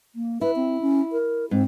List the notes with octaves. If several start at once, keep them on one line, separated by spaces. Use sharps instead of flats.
A#3
E4 B4
C4
C#4
A#4
G#2 C4